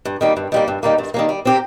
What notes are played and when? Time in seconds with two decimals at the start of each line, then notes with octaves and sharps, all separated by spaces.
0.05 G2
0.21 D#3 G3 A#3
0.37 G2
0.52 D#3 G3 A#3
0.68 G2
0.83 D#3 G3 A#3
0.98 G2
1.14 D#3 G3 A#3
1.29 G3
1.45 C4 G4 A#4